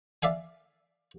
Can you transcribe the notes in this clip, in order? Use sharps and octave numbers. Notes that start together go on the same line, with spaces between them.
D5 E5 F5 G#5